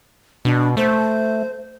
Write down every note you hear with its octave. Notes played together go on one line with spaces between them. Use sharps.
B2 D4
A3 C5